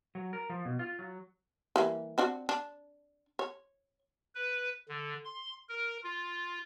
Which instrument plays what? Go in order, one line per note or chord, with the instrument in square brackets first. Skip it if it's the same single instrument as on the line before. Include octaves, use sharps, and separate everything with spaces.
[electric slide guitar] F#3
A#4
F3
B2
F4
F#3
[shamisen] E3 G3 A#3
C4 D4 F#4
D4
C#5
[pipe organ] B4
D3
C6
A#4
F4